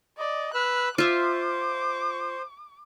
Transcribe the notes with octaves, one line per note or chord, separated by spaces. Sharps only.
D5 D#5
B4 E6 F#6
F4 C5 E5 D6